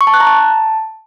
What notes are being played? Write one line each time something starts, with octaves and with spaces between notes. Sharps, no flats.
C#6
A5
F#6
A#5
A5